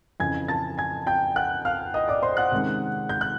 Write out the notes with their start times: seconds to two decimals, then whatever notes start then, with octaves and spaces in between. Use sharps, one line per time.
0.20 F2 C#3 E3 G#5 G#6
0.48 A5 A6
0.78 G#5 G#6
1.07 G5 G6
1.35 F#5 F#6
1.65 F5 F6
1.94 D#5 D#6
2.08 D5 D6
2.22 C5 C6
2.37 F#5 F#6
2.52 C3 D#3 G#3 C#4
3.09 G6
3.21 F#6